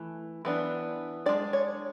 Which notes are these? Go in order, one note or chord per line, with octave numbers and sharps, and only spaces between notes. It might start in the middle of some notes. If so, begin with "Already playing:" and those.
Already playing: E3 A3
E3 B3 D4
G#3 D4 D5
C#5